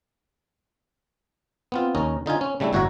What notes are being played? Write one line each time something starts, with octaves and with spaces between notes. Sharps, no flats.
B3 C4 F4
D#2 C#4 A#4 D#5
D3 D#4 F4 G#5
C#4
C#3 G3 A3 D4 E4
G1 A2 F#4 C#5 E5 A#5